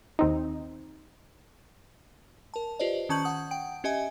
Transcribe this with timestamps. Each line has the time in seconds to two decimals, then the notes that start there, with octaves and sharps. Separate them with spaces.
0.19 D#2 C4 D#4
2.54 A#4 A5
2.79 F4 G4 B4 C5 D5 D#5
3.09 D#3 C#4 A5 C#6 G6 F#7
3.25 F#5 D#6
3.51 F#5 G5 D7
3.84 C#4 G4 D#5 E5 G#5